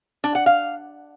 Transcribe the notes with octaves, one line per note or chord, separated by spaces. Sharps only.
D4
F#5
F5